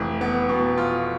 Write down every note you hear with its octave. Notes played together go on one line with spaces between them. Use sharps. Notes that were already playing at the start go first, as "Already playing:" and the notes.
Already playing: F1 E3
B3
B2
F4